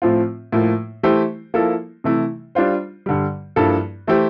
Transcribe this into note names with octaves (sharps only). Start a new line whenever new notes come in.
A2 F3 C4 F4
A2 F3 A#3 E4
E3 A3 E4 G4 C5
F3 A#3 E4 A4
C3 E3 A3 E4
G3 D4 F4 C5
G2 D3 G3
G2 F3 A#3 E4 A4
E3 A3 E4 G4 C5